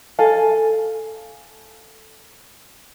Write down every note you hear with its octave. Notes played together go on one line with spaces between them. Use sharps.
A4 F5 G#5